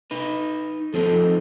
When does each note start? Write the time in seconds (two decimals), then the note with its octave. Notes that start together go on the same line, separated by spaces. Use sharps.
0.11 D#4 B4
0.94 F3 C4 D#4 A4